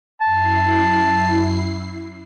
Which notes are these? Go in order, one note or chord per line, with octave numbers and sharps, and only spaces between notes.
F#2 E4 A5 C7